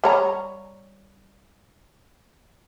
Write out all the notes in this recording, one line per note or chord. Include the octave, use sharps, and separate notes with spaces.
G3 C#5 A#5